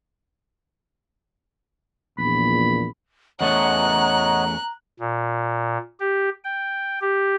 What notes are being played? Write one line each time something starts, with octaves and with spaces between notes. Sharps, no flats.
A#1 E2 A#2 B5
E2 A3 C#4 C#5 D#5 F#5 A#5 F#6
A#2
G4
G5
G4